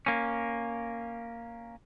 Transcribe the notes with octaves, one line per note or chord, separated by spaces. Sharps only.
A#3 C#4